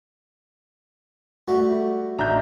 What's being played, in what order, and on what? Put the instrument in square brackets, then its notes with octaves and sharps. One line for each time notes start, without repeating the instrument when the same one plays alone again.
[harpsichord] G3 A3 [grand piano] F#4
[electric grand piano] A1 D4 E5 [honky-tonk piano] A#5 G6